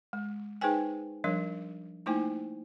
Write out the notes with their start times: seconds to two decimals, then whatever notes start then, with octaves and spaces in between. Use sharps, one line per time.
0.13 G#3
0.61 D#4 G#4 B4 C5 G5 G#5
1.24 F3 G3 D4 A#4 C#5
2.06 A3 A#3 D#4 E4 C5 G#5